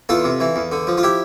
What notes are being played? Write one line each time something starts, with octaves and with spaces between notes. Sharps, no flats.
E2 F4 A4
C3
E3
E2
D3
F3
F4
E4 G4